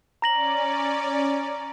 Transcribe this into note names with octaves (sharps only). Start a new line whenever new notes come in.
C#4 D5 A#5 A#6 F#7